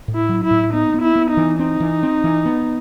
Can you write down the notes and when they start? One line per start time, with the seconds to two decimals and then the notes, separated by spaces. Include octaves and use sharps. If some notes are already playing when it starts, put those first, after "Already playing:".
0.08 A2
0.15 E4
0.29 F#3
0.44 E4
0.51 A2
0.73 B3 D#4
0.94 B3
1.02 E4
1.16 B3
1.30 D#4
1.37 E3
1.59 C4 D#4
1.80 E3
2.03 C4
2.24 E3
2.45 B3